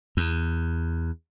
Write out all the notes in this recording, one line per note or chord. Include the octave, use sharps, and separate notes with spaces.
E2